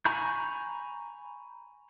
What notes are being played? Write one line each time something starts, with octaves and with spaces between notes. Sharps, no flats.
G#5 A#5 B5 C#6 G6